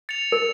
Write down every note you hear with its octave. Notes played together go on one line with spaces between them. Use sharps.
A6 C#7 F7
A#4